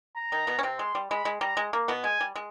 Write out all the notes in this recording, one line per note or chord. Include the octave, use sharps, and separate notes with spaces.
A#5
D#3 D#4
B2 B3
C#4
C3 C4
G#3 C6
G3
G#3 B5
G#3
G3 A#5
G#3
A#3
B2 B3
G#3 G#5
G3
G#3